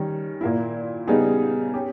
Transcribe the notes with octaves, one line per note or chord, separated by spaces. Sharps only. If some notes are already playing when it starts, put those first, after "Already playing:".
Already playing: D#3 G3 C#4
A#2 A#3 E4
C#3 G3 B3 D#4 G#4
C#4 G4